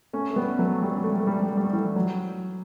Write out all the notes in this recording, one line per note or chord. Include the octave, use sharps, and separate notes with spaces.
A3 C#4
A3
G3 B3
F#3 A3
G3
A3
G3
A3
G3
A3
G3
A3
G3
A3
G3
A3
E3 G3
F#3